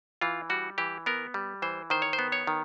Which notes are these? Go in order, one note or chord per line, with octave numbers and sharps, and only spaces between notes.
E3 F4
G3 F#4
E3 G4
B3 A#4
G3
E3 C5
D#3 C5
C#5
C5
B3
C#5
D#3